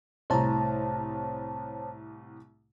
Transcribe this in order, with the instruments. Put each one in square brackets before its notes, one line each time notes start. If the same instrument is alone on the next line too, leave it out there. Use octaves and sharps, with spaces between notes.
[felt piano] C2 A2 A#5 [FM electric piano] C5 C#5 A5